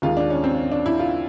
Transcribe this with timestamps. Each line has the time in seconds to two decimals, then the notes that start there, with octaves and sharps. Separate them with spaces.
0.02 D#2 D#3 G#3 F4
0.17 D4
0.30 C#4
0.44 C4
0.59 C#4
0.71 D4
0.86 E4
1.00 F4